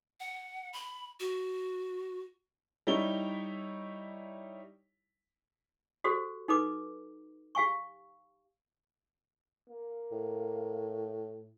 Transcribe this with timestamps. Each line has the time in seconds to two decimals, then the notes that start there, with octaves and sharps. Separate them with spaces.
0.20 F#5
0.73 B5
1.20 F#4
2.87 G3 D#4 E4 C#5 G7
6.04 F#4 G4 A4 C5
6.48 D#4 A4 B4 D6
7.55 G4 F5 G#5 C#6
9.69 A#3
10.12 A2